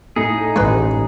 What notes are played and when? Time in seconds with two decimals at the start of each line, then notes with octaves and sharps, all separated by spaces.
0.16 A2 D#4 G#4
0.56 A1 G#3 B4